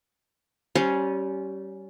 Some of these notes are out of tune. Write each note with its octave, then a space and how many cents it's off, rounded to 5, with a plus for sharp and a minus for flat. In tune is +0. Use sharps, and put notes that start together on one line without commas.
G3 -20 C#4 +0 C6 +0